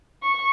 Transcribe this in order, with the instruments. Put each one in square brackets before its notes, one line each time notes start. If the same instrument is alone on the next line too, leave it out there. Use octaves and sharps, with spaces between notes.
[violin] C#6